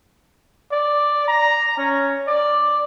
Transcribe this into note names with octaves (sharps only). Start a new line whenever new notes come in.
D5
A#5
C#4
D5